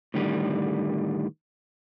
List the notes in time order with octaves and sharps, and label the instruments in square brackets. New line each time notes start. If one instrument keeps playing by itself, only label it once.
[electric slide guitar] A2 D3 D#3 G3